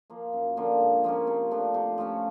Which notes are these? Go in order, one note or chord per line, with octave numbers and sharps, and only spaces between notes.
F3 A#3
F#2
D3 F3 A#3
G#2
F3 A#3 C#4
C3
F3 A3 D4
C3
F3 A3 C#4